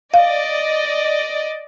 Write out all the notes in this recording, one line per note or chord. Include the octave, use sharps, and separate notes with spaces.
D5 D#5 F5